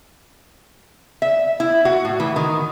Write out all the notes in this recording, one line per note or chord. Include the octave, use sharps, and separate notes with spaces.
E5
E4
F#4
A2
E3
D#3